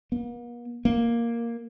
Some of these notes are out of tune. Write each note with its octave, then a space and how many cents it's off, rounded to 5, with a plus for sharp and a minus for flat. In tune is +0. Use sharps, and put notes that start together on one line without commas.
A#3 +45
A#3 +0